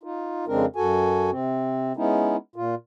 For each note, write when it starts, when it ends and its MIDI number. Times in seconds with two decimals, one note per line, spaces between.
0.03 0.45 63
0.03 0.45 65
0.48 0.66 41
0.48 0.66 49
0.48 0.66 56
0.48 0.66 60
0.48 0.66 62
0.48 0.66 70
0.76 1.30 42
0.76 1.30 66
0.76 1.30 69
0.76 1.30 80
1.31 1.93 48
1.31 1.93 60
1.97 2.37 56
1.97 2.37 59
1.97 2.37 61
1.97 2.37 63
1.97 2.37 64
2.56 2.75 46
2.56 2.75 65